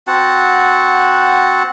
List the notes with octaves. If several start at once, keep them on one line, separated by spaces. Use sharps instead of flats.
C4 F#4 F#5 A5